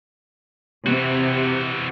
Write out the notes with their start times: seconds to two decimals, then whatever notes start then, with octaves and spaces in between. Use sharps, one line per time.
0.87 C3 E3 F#4